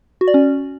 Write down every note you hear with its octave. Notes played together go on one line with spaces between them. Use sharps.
F#4
D5
C#4